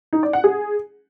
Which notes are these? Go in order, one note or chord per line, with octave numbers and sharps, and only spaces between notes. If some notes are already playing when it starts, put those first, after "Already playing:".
D#4
D5
F#5
G#4